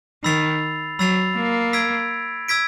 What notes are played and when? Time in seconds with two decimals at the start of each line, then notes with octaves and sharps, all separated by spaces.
0.24 D#3 B5 E6 A6 C7 F7
0.99 F#3 B5 E6 A6 C7 F7
1.37 A#3
1.73 E6 G#6 B6 D7
2.48 E6 G#6 B6 D7